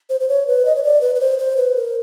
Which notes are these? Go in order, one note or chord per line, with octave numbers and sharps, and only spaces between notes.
C5
C5
C#5
B4
D#5
C#5
D5
B4
B4
C5
C5
B4
A#4